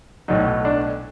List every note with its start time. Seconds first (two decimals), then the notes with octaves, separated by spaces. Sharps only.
0.28 B1 A2 F#3 D#4
0.65 D4